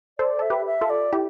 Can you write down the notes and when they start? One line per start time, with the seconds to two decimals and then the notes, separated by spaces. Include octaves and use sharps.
0.19 A4 C5 D5
0.39 A4 E5
0.50 G4 B4
0.66 E5
0.81 F4 A4
0.90 D5
1.13 E4 G4